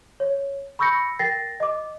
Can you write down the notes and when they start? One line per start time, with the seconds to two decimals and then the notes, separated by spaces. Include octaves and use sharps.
0.20 C#5
0.79 B5 C#6 E6 G6 A#6 C#7
1.19 A#4 G5 A6 A#6 C7
1.60 D#5 D6